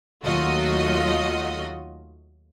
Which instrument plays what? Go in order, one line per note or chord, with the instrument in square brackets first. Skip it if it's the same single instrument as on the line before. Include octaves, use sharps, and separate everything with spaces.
[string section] D#2 F#3 A3 F4 F#4 D#5